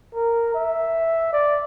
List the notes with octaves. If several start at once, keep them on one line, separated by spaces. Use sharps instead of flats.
A#4
E5
D5